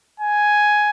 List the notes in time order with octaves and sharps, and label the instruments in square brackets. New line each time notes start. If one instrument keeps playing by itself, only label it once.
[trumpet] G#5